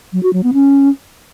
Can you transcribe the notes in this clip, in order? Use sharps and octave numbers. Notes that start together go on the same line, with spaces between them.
F#3
F#4
F#3
B3
C#4